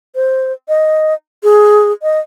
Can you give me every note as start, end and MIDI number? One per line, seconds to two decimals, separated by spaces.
0.16 0.52 72
0.68 1.14 75
1.44 1.92 68
2.03 2.20 75